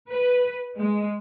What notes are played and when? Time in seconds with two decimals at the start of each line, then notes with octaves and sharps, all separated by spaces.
0.10 B4
0.77 G#3